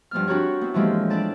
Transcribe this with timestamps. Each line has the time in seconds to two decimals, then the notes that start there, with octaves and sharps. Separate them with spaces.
0.11 G2 F3 B3 F6
0.28 C4 D4 F#4 G4 A#4 C#5
0.61 B3 C4 E4
0.74 A2 E3 F3 G#3 A#3 G4
1.10 D4 E4 D5 A5